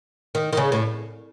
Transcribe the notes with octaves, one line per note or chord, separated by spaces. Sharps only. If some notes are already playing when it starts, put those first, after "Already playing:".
D#3
D#3
C#3
A2